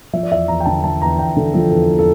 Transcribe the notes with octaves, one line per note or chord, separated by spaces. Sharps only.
F3 E5
D5
E2 E5
E2 A#5
G5
D3 A5
F3 A5
E2 A#5
E2 G5
D3 A4
F3 A4
E2 A4
E2
A4